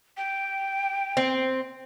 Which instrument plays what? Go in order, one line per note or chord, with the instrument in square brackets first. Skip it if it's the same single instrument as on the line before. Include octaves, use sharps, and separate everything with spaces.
[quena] G5
[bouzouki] C4